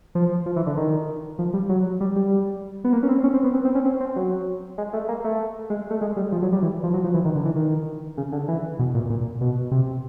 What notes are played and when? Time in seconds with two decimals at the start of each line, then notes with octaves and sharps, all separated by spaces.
0.15 F3
0.46 F3
0.56 E3
0.67 D3
0.77 D#3
1.39 F3
1.54 G3
1.69 F#3
2.01 G3
2.16 G3
2.84 B3
2.93 A#3
3.03 C#4
3.09 C4
3.24 C#4
3.34 C4
3.44 B3
3.54 C4
3.65 C4
3.75 C#4
3.86 C4
4.01 C4
4.16 F#3
4.78 G#3
4.93 A3
5.08 A#3
5.24 A3
5.70 G#3
5.91 A3
6.01 G#3
6.16 G3
6.32 F3
6.42 F#3
6.52 G3
6.62 E3
6.83 F3
6.94 F#3
7.04 F3
7.14 E3
7.25 D#3
7.35 D3
7.45 E3
7.55 D#3
8.17 C#3
8.32 D3
8.48 E3
8.79 B2
8.94 A#2
9.10 A#2
9.41 B2
9.71 C3